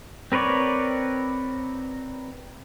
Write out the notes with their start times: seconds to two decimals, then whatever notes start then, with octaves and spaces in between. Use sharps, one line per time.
0.32 C4 A#4 B4 C#5 D5